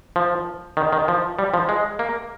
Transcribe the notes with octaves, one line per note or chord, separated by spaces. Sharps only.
F3
D#3
D#3
F3
G3
F3
G#3
A#3